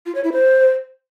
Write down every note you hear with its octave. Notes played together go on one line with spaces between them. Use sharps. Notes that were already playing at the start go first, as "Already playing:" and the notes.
F4
C#5
E4
C5